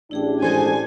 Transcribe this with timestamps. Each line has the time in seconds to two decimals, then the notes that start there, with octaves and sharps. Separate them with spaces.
0.11 A1 D4 E4 G#4 G5
0.42 G#3 A4 C5 G#5